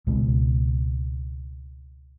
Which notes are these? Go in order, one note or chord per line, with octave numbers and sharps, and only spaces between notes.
C#2 B2 G#3